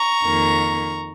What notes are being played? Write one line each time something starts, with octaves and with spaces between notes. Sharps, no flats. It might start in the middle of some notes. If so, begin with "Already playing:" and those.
Already playing: A#5 C#6
F2 D#3 A#3